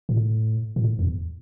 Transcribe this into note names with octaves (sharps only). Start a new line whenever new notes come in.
A2
A2
E2